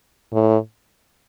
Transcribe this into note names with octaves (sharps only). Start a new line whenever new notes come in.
A2